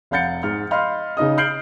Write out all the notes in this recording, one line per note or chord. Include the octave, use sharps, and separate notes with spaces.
F1 F5 F#5 G6 A6 C#7
G#2 F6
D#5 F5 B5 C6 F6
C#3 D#4 D#5 D#6
F6 G6 C7 D7 F#7